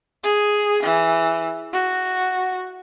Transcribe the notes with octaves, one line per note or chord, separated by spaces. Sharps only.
G#4
E3
F#4